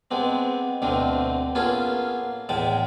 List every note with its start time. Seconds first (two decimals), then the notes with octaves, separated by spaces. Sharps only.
0.11 G#3 B3 C4 D4
0.82 D2 B2 D3 A3 C4
1.55 A#3 B3 C#4 F4 G#4 A4
2.49 E2 A2 G#3 G5 A5